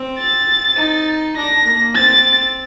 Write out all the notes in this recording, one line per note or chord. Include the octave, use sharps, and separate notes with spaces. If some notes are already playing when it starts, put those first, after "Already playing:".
Already playing: C4
A6
D#4
D4 A#6
A#3
C4 A6